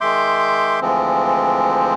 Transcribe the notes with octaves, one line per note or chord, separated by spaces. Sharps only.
D#3 G#3 E5 C6 D6 G6
D2 E3 F3 G#3 C4